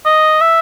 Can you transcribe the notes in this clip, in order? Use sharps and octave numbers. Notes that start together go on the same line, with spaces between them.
D#5
E5